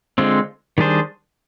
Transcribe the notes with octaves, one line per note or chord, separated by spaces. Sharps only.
D3 G#3 C4 F4
D#3 G3 D4 G#4 C5